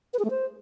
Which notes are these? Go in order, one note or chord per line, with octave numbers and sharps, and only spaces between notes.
B4
G#4
A3
C5